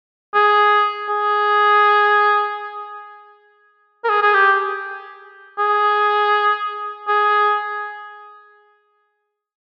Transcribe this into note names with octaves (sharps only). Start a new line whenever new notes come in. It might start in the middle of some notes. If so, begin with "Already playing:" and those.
G#4
G#4
A#4
G#4
G#4
G4
G#4
G#4